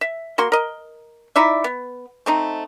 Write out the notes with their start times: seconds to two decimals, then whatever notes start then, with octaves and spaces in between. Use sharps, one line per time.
0.01 E5
0.38 A#3 F#4 C6
0.52 A#4 D#5
1.36 D#4 E4 D5 E5
1.64 B3
2.26 A3 C4 D#4